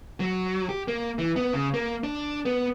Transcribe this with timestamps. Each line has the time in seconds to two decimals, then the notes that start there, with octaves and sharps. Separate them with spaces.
0.20 F#3
0.69 G4
0.88 A#3
1.19 E3
1.36 B3
1.53 C#3
1.74 A#3
2.04 D4
2.45 B3